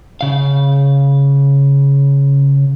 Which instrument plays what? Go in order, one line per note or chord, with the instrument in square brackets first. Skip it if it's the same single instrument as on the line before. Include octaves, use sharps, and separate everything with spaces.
[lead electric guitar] C#3 F5